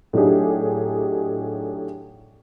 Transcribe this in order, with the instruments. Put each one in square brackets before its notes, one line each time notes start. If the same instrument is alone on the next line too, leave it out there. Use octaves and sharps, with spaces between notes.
[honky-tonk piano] A2 F#3 D4 D#4 G4 G#4